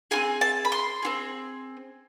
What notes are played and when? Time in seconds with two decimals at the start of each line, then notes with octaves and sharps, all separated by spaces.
0.11 C4 F4 G#4 G#5
0.41 A5
0.65 B5
0.72 C6
1.03 C4 F4 G#4